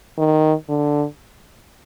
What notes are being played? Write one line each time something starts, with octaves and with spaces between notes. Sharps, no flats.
D#3
D3